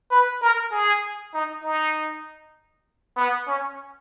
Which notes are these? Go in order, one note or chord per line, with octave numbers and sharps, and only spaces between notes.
B4
A#4
G#4
D#4
D#4
B3
C#4